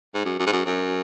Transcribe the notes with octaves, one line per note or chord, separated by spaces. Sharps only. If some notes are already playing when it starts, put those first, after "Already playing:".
G#2
F#2
F#2
G#2
F#2
F#2